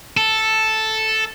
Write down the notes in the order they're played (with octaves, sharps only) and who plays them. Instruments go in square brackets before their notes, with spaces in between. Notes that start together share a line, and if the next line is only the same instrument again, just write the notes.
[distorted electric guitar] A4